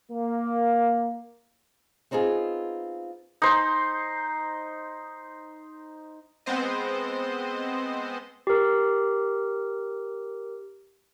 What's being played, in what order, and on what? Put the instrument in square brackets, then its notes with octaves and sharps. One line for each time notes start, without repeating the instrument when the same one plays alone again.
[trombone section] A#3
[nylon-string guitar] B3 C4 D#4 F4 G#4
[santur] D#4 C5
[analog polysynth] G#3 B3 C4 C5 D#5
[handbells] G4 A#4